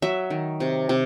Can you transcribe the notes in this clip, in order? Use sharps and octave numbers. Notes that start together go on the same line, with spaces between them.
F#3 E5
D#3
C3
C3